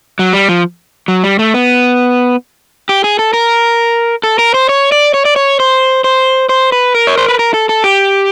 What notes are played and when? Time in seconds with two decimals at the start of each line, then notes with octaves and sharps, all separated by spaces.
0.19 F#3
0.33 G3
0.49 F3
1.08 F#3
1.24 G3
1.39 A3
1.54 B3
2.89 G4
3.04 G#4
3.19 A4
3.33 A#4
4.23 A4
4.39 A#4
4.54 C5
4.69 C#5
4.92 D5
5.14 C#5
5.25 D5
5.36 C#5
5.60 C5
6.04 C5
6.49 C5
6.72 B4
6.94 A#4
7.07 C#5
7.18 C5
7.28 B4
7.39 A#4
7.54 A4
7.69 A4
7.84 G4